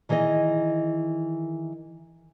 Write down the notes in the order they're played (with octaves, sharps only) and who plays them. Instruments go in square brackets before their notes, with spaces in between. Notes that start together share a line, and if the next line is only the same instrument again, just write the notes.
[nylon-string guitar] D#3 E3 G#4 C#5 D#5